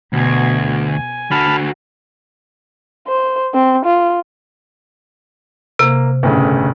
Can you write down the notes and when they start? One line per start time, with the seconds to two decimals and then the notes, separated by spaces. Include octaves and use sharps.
0.13 D2 B2 G#6
0.86 G#5
1.31 D3 F#4 A5 B5 F6
3.08 C5
3.54 C4
3.85 F4
5.79 C3 A#3
6.23 G1 A2 C#3